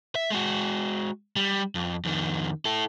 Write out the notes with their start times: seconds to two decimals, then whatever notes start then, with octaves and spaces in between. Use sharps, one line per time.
0.15 E5
0.30 G#3 F#4
1.36 G3
1.75 F2
2.05 F2 D#3
2.65 E4 A4